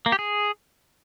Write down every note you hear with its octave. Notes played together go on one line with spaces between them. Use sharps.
A#3
G4
G#4